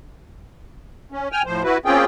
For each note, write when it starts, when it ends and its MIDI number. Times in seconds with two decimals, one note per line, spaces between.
1.12 1.28 61
1.32 1.42 79
1.32 1.42 80
1.32 1.42 89
1.46 1.63 45
1.46 1.63 53
1.46 1.63 72
1.64 1.78 64
1.64 1.78 66
1.64 1.78 71
1.85 2.05 58
1.85 2.05 60
1.85 2.05 61
1.85 2.05 65
1.85 2.05 68
1.85 2.05 79